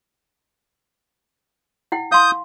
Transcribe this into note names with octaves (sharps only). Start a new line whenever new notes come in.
E4 F#5 G5
F5 C6 D#6 G6